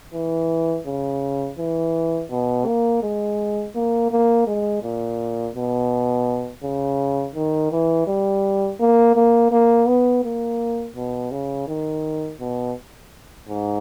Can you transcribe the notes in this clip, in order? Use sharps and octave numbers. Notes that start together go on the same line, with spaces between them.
E3
C#3
E3
B2
A#3
G#3
A#3
A#3
G#3
A#2
B2
C#3
D#3
E3
G3
A#3
A#3
A#3
B3
A#3
B2
C#3
D#3
B2
G#2